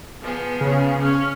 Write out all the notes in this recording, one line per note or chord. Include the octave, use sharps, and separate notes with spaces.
F3 B3 G#4
C#3
C#4 C#5 F6